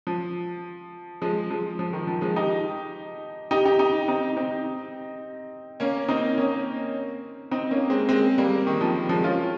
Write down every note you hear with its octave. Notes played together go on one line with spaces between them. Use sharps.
F3
F3 G#3
F3 G#3
F3
D#3
F3
F3 G#3
D#4 G4
D#4 G4
D#4 G4
D#4 G4
C4 D#4
C4 D#4
A#3 C#4
C4 D#4
A#3 C#4
C4 D#4
A#3 C#4
G#3 C4
G#3 C4
G3 A#3
D#3
F3
F3 G#3
C#4 F4